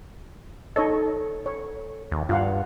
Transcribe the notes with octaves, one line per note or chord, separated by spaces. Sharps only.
D#4 A4 C#5 D#5
C#5
D#2
G2 F4 F5 F#5